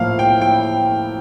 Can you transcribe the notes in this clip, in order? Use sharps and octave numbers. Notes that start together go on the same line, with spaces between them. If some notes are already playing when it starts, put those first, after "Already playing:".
Already playing: A2 F3 A#3 E4 F5
G5
G5